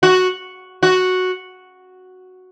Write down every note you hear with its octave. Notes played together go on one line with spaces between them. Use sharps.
F#4
F#4